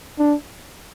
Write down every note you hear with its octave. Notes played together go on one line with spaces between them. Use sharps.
D4